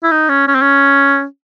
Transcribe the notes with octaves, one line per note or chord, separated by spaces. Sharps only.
E4
D#4
C#4
C#4
C4
C#4